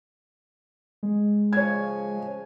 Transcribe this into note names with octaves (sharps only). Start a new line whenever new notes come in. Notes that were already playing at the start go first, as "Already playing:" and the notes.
G#3
C#3 F3 C#5 G#5 G#6